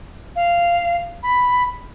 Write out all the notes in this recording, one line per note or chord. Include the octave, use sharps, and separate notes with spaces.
F5
B5